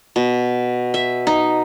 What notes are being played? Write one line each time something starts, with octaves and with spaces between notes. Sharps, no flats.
B2
E5
D#4